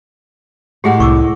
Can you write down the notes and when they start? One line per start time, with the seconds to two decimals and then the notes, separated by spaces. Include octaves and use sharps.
0.84 A2 G#3 G4 G#4 F#5
1.00 C2 C#6 D6 E6